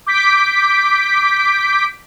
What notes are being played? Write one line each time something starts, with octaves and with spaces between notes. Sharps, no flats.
D6 G6 B6 D7